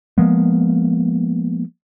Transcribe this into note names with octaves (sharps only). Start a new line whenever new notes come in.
F3 G#3 A#3 B3